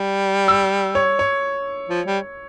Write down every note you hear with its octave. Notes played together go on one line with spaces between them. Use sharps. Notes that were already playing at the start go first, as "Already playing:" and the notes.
Already playing: G3
E6
C#5
C#5
F3
G3